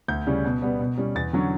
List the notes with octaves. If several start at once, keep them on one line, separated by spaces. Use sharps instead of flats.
D2 G6
C#3 G3 C#4
B2
G3 B3
B2
G3 C#4
E2 A6
D3 F#3 C#4